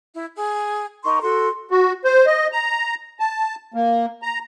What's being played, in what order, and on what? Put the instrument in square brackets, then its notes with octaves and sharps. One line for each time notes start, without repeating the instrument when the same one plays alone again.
[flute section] E4
G#4
[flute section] D#4 A#4 C6 [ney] C#6
[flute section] F#4 C6 [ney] A4
[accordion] F#4
C5
D#5
A#5
A5
A#3
A#5